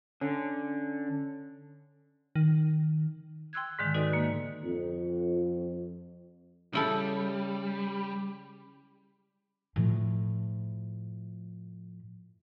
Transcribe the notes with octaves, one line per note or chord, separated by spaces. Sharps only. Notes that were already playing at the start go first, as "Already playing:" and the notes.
D3 C#4
D#3
G5 C6 E6 F#6 G#6
G#2 D3 D#3 G#3
D#4 F#4 A4 B4 D5 D#5
D3 A#3
F2
C#3 G3 E4 A4
A2 F3